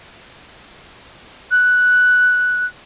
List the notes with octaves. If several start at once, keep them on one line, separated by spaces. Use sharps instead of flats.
F#6